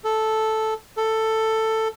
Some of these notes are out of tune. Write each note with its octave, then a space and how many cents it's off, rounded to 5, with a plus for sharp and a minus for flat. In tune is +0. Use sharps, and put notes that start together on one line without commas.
A4 -5
A4 +10